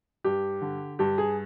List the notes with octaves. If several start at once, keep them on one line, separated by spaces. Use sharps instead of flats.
G2 G4
D3
G2 G4
G#4